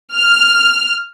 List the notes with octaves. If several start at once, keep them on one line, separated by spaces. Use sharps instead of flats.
F6